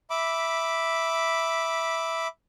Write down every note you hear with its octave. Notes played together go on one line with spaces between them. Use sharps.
E5 B5 D6